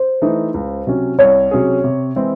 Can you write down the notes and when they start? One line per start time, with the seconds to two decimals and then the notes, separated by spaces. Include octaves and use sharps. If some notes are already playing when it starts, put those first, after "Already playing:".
Already playing: C5
0.22 E3 A3 D#4
0.54 C#2
0.87 C3 F#3 C#4
1.19 C2 C#5
1.51 C3 F#3 C#4 G#4
1.84 C3
2.16 E3 G#3 C4 E4